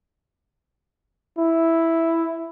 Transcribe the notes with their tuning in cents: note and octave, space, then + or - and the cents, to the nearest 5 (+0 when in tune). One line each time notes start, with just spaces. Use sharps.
E4 +0